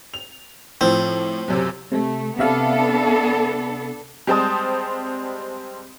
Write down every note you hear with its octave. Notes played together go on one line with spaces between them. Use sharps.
F7
A2 F3 C4
F#1 F#2 C3
C3 A3
C3 B3 D4 A4 E5 F5
G3 G#3 C4 C5 A5 D#6